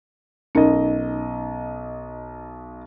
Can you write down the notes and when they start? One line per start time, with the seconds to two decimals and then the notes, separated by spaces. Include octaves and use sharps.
0.55 B1 C#4 D#4 A#4 D#5